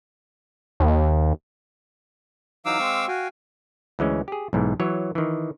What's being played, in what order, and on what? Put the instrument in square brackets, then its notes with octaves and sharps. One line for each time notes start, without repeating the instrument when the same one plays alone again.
[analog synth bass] D#2
[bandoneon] E3 F#3 D#4 [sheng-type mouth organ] F5 D6 E6
[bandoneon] G#3 C4 C#6
[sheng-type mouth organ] F#4 [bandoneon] F5 G5 G#5
[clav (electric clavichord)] D2 E3 G#3 C#4
G4 G#4
B1 G#2 E3
E3 F#3 C#5
D#3 E3